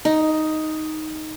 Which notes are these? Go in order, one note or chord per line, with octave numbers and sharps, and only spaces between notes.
D#4